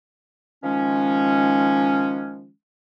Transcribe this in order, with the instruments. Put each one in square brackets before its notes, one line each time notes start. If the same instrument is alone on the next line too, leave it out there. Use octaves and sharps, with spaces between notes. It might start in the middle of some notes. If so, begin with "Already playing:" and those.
[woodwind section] D#3 F3 G#3 C#4